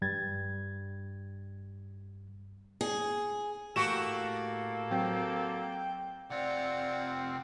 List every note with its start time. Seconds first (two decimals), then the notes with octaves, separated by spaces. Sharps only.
0.02 G2 G3 G#6 A6
2.81 G#4
3.76 A2 A#3 F#4 G4 A4 E7
4.91 F#3 C4 G5
6.30 C3 C4 F4 D5 F#5